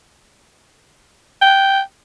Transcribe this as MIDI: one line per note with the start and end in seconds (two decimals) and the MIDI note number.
1.42 1.80 79